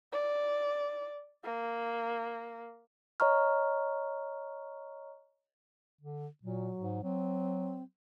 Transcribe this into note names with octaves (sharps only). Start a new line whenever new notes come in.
D5
A#3
C#5 D#5 A#5 C#6 F6
D3
A#2 F#3
G#2
F#3 C4